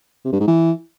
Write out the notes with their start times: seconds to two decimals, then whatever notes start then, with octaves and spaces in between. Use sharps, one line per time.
0.25 C3
0.32 G2
0.40 G#2
0.47 E3